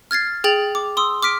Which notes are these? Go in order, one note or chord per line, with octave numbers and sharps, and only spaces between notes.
F6 G#6 A6 C7
G#4 G5 A6 F7 F#7
D6
C6 D#6 E6
D6 F6 B6 D7